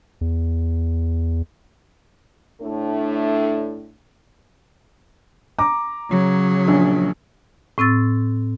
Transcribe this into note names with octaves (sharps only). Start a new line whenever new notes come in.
E2
A2 A3 D4
A#5 D6
C#3 F#3
A#1
A2 C4 E6 A6